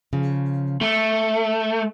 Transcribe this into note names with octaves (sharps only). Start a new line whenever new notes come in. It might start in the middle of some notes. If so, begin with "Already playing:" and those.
C#3 F3
A3 A4